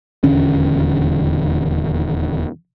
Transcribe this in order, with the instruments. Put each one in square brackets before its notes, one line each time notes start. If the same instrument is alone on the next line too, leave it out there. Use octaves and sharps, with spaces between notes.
[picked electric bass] D#1 E2 D3 C#4